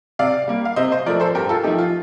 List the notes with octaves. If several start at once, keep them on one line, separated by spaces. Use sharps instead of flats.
C3 D5 F5
G3 A#3
F5
C3 C5 D#5
C5 D#5
F3 A3 A#4 D5
A4 C5
G2 G4 A#4
F4 A4
F3 A3 D#4 G4
F4